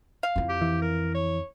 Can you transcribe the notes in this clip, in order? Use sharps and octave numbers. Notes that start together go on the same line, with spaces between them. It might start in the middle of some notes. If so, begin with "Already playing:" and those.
F5
F2 E4
G4
E3
A#4
C#5